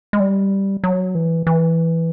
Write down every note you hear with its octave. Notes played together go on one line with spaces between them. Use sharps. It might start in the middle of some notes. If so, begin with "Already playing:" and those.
G#3
G3
F#3
E3
E3